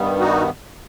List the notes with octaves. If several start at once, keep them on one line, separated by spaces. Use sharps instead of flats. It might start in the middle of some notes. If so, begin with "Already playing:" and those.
Already playing: G2 D#3 G3 B3
D#4 F#4